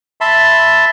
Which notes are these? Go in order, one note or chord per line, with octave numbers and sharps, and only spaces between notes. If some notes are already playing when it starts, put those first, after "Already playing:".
E5 A5 B5 C6